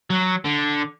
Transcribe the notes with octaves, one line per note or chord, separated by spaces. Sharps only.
F#3
D3